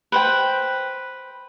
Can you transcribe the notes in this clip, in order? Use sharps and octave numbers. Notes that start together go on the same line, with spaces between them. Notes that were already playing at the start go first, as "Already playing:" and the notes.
B4 C5 G5